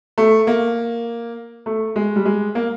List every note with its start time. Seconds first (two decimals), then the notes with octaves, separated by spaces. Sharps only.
0.18 A3
0.47 A#3
1.66 A3
1.96 G#3
2.16 G3
2.25 G#3
2.55 A#3